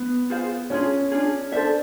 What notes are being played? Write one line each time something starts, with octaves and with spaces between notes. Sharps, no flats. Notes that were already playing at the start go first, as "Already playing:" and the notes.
Already playing: B3
F4 G#4 C5 F5
C#4 D4 F4 G#4
D4 F4 G#4
D4 A4 C5 E5